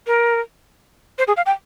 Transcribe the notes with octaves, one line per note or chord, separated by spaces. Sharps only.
A#4
C5
G#4
F5
G5